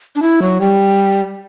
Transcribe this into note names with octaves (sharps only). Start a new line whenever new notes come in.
D4
E4
F#3
G3